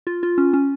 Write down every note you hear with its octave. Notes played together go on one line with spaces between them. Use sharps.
F4
F4
C#4
C#4